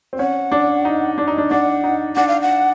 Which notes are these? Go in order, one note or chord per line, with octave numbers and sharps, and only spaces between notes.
C4
C#4 F#5
D4
D#4
D4
D#4
D4
D4 F#5
D#4
D4 F#5
F5
F#5